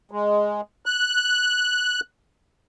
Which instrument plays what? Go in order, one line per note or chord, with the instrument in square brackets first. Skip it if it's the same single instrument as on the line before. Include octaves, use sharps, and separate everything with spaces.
[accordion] G#3
F#6